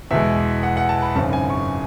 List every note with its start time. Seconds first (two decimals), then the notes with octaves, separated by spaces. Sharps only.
0.11 E2 B2 G#3 E5
0.63 F#5
0.77 F#5
0.89 A5
1.02 B5
1.15 G#1 F#2 C#3 A5
1.33 G#5
1.50 C#6